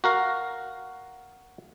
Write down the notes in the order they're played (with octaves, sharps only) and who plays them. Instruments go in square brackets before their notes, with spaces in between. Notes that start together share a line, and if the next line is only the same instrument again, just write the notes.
[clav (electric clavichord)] F#4 A#4 F5